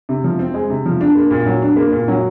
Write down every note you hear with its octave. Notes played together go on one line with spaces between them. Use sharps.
C3
F3
C4
G#3
C3
F3
D4
A#3
A#2
F#3
D4
A#3
A#2
F#3